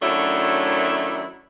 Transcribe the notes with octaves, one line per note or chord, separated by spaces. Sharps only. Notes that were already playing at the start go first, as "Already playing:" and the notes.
F#2 D#3 F#3 A3 D4 E4